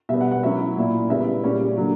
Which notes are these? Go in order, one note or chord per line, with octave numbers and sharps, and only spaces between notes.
B2 G3 B3 E5
F#5
F#5
F#3 C#4 E4 E5
A#2 A#3 E4
C#3 G3 B3 E4 E5
A#2 G3 C#4
D3 F#3 A#3